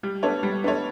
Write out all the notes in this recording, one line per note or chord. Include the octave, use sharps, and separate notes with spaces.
G3
B3 D4 A4 C#5
G3
B3 D4 A4 C#5